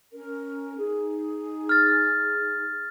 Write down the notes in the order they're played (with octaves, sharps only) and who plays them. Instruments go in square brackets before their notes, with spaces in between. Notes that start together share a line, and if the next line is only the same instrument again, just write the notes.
[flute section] C#4 A#4
D#4 G#4
[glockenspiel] F6 A6